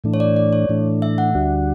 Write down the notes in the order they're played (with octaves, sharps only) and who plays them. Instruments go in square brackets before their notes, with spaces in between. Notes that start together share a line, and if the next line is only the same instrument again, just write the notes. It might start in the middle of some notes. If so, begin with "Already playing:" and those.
[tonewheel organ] A2 E3 A3 D4
[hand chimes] C#5
D5
D5
C#5
[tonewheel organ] A2 E3 A3 D4
[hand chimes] E5
F#5
[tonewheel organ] D2 D3 G3 D4 F#4